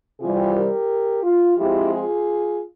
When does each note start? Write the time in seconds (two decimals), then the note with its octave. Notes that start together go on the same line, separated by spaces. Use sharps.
0.21 C3 E3 G3 C4 F4 G#4
0.55 G4 A#4
1.23 F4
1.57 F3 G#3 C4 E4 G4
1.91 F4 G#4